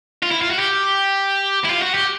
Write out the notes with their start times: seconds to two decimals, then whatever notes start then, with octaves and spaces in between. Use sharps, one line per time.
0.23 F4
0.31 E4
0.41 F4
0.51 F#4
0.59 G4
1.65 E4
1.70 F4
1.82 F#4
1.94 G4